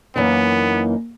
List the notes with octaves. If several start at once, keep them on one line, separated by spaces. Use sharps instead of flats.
F#2 E3 A#3 B3 D#4